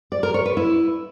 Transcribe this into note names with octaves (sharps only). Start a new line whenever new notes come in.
D5
A#4
C#5
B4
E4